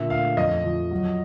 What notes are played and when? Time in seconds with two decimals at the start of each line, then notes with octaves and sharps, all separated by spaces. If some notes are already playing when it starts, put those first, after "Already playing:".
Already playing: A#2 D3 E5
0.10 A3 F5
0.37 F2 D#5
0.64 F3
0.91 F#3